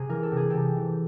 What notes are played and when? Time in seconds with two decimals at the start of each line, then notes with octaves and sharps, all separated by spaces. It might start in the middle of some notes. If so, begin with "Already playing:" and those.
Already playing: C3 G#4
0.09 E3 A#4
0.23 A4
0.31 C3
0.37 G#4
0.50 C3 G4 A4
0.76 E3